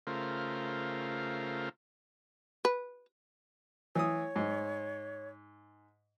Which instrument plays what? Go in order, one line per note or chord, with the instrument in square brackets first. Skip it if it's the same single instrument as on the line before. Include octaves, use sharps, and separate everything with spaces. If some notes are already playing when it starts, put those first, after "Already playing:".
[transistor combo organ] C#3 A3 F4 A#4 C5
[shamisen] B4
[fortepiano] E3 D#6 [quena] C#5
[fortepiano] G#2